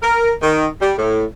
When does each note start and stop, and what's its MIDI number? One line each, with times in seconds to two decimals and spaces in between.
0.03 0.33 70
0.42 0.67 51
0.82 0.94 55
0.98 1.25 45